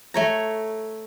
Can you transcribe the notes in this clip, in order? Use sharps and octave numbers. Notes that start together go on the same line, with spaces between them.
A3 C#5 A#5